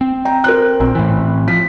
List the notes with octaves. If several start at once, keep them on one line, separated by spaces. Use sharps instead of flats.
C4
G5 A#5
A#4 C5 F#6
A#1 C4
A2 E3
F3 B6